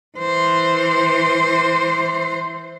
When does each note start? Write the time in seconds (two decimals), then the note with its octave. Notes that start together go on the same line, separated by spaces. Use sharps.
0.18 E3 C5